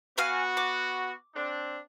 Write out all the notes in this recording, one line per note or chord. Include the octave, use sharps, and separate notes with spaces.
B3 F#4 F5 G#5 F6
D6
C4 D4